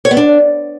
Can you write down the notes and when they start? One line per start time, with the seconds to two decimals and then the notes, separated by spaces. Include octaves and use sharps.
0.05 C#5
0.11 B3
0.17 D4